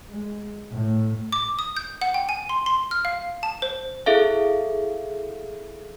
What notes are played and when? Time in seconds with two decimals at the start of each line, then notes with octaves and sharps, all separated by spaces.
0.11 G#3
0.71 A2
1.32 D6
1.59 D#6
1.77 G6
2.02 F#5
2.14 G5
2.29 G#5
2.49 C6
2.66 C6
2.91 F6
3.05 F5
3.43 A5
3.62 C5
4.06 E4 G#4 A4 E5 F5